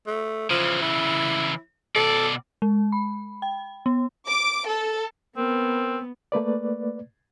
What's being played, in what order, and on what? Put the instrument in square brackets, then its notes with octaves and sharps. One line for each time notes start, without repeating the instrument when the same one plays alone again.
[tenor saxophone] A3
[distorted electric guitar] C#3 E3 [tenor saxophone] F3
[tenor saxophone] E4
[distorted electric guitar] B2 D5 [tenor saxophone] A4
[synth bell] G#3
B5
G5
B3
[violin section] D6
A4
[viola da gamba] B3 [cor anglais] C4 [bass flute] A#4
[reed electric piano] A3 A#3 B4 D5